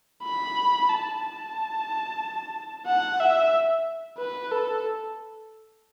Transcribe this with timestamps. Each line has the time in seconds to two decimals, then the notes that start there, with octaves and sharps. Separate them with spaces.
0.24 B5
0.90 A5
1.22 A5
2.87 F#5
3.20 E5
4.18 B4
4.51 A4